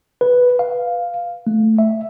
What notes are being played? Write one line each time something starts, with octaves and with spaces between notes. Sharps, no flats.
B4
F5
A3
E5